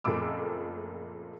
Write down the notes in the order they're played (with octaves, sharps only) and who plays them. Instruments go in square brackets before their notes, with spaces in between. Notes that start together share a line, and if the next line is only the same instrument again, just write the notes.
[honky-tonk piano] F#1 F2 A#2 A3 D6 E6